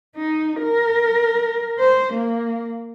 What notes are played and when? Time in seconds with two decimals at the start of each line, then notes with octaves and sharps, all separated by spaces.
0.17 D#4
0.61 A#4
1.79 C5
2.13 A#3